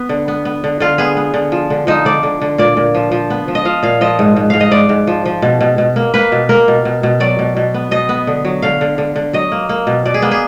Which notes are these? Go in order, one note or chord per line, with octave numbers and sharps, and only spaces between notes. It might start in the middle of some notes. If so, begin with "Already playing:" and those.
Already playing: B3
D3
B3
B3
D3
D3 F4
B3 G#4
B3
D3
F3
D3
F3 D#4
D3 D5
D3
D3
A#2 D5
A#2
F3
F3
B3
F3
D#5
F3 F5
A#2 F5
F3 D#5
G#2
G#2
G#2 F5
D#5
G#2 D5
G#2
F3
F3
B2
B2
B2
A#3
A#3 B4
B2
A#3 A#4
B2
B2
B2
F#3 D5
B2
B2
B3
B2 D#5
B3
D3
F#3
D3 F5
D3
D3
D3
F#3 D#5
A#3
A#3
B2
B2 D5
G#4
A#3 B3
G#4